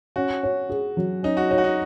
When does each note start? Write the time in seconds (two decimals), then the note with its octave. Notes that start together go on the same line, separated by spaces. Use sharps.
0.16 C#4 F#4
0.43 C#5
0.70 G#4
0.97 F#3
1.23 C#4 D#4
1.37 F#4
1.51 D#4 C#5
1.58 F#4
1.64 D#4